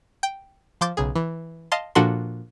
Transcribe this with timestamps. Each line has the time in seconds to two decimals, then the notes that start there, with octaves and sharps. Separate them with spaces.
0.23 G5
0.81 F3 C6 D6 G6 A6
0.97 B1 C#3 G#4
1.16 E3
1.72 D#5 F5 A5 C6
1.95 A#2 F3 D4 F#4 A4 C6